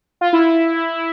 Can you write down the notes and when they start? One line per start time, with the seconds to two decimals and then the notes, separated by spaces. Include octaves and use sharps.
0.21 F4
0.33 E4